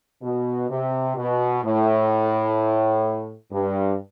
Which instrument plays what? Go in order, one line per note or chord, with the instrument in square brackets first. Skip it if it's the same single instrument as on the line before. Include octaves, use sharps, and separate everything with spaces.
[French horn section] B2
C3
B2
A2
G2